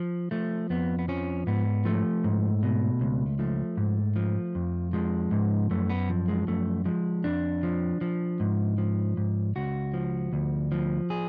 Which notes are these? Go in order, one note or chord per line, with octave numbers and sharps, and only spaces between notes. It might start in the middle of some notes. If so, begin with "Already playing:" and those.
Already playing: F3
F3 A3
F2 B3
B3
F3 C#4
G#2 B3
F3 A3
G#2
B2
C#2
F3 A3
G#2
F3
F2
F3 G#3
G#2
F#2 A3
B3
F3
G#3
F#2 A3
F3 G#3
F2 D4
F3
F3
G#2
F3
G#2
C#2 F#4
F3
D2
F3
G#4